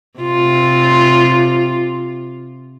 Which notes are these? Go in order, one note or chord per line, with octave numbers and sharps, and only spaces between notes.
C3 F4